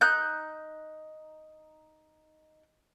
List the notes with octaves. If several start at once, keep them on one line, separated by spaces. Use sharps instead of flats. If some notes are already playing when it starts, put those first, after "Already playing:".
D#4 F#6 G6